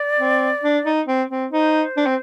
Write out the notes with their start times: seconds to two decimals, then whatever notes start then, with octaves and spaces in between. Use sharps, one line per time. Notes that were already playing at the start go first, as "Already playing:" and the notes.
Already playing: D5
0.19 C4
0.63 D4
0.85 D#4
1.07 C4
1.30 C4
1.52 D#4 C5
1.97 D4
2.06 C4